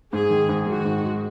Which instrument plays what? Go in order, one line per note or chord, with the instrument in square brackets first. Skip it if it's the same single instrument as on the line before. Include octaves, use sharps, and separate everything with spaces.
[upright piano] G#2 [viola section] G#4
[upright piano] D#3
G#2
[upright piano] D#3 [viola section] F#4
[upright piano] G#2
G#3